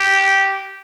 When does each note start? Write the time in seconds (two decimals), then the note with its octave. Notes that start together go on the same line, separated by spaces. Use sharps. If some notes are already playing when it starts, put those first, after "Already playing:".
Already playing: G4